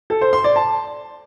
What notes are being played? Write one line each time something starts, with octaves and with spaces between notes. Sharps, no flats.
A4
C5
C6
D5
A5